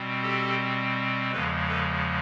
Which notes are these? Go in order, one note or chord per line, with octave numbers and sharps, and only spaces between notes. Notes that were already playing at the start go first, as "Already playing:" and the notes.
Already playing: B2 G3 C4
G4 A4
E2 C#3 F3 G#3 A4 B4
A4 B4